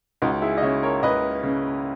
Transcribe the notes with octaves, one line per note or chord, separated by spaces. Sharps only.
C#2 D#4 F#4
E4 G#4
D#5
C#3 C#5 E5
A#4 C#5
C#2 B4 D#5
C#3